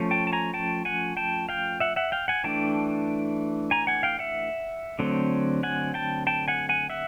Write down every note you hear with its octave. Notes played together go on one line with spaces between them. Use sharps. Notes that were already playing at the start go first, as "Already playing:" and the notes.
Already playing: F3 A3 C#4
G5 A5
A5
G#5 A#5
G5 A5
F#5 G#5
G5 A5
F5 G5
E5 F#5
E5 F#5
F5 G5
F#5 G#5
E3 A3 D4 G5 A5
G#5 A#5
F#5 G#5
F5 G5
E5 F#5
D3 F#3 A3 C4
F#5 G#5
G5 A5
G5 A5
F#5 G#5
F#5 G#5
E5 F#5